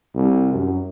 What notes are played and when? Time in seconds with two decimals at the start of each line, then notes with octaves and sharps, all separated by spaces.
0.15 C2
0.54 F#2